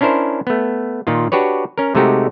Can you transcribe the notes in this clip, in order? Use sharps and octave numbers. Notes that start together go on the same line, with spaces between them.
C#4 D4 E4 A#4 C5
A3 B3
A#2 D#3 F4
D4 F#4 G4 B4 C#5
C#4 A#4
C3 G#3 A3 D#4 F#4 G4